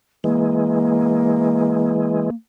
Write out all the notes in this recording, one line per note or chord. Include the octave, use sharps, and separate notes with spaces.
E3 G#3 A#3